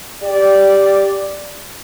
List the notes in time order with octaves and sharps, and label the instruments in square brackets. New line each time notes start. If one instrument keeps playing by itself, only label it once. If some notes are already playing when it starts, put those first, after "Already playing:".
[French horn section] G4 D5